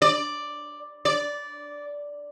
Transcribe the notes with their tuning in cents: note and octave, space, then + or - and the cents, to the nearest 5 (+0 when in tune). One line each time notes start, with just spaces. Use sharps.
D5 +5
D5 -10